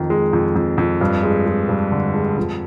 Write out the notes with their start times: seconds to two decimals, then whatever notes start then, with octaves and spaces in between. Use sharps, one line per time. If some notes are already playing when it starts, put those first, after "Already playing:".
Already playing: F2 D#3
0.10 G#3
0.33 F2
0.55 F2
0.78 F2
1.01 G2
1.23 G#3
1.46 G#3
1.69 G2
1.92 D3
2.15 G#3
2.37 F2